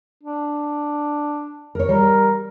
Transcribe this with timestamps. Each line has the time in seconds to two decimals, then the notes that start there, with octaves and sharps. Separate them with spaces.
0.23 D4
1.75 A#4 C#5
1.89 G3 A#4